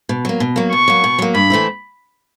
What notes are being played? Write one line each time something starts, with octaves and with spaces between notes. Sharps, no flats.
B2
F#3 A#3
B2
F#3 A#3
B2 C#6
F#3 A#3
B2
F#3 A#3
G2 B5
E3 A3 C4 E4